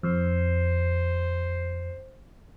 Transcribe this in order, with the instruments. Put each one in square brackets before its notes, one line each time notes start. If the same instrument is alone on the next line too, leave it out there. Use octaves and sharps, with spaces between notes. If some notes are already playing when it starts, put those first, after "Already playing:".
[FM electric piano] F2 [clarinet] C5